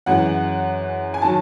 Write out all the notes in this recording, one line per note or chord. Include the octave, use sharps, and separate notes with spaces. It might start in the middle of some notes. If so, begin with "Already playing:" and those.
F#2 E3 G#3 F#5
G#5
D#3 F#3 A5